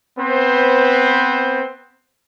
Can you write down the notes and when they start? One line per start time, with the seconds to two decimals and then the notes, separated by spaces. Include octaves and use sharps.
0.18 B3 C4 B4 C5